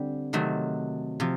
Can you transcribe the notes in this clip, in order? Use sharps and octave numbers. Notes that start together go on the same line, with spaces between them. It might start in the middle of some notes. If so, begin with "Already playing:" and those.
Already playing: D3 G3 C4
C3 D#3 F#3 A3
C3 F3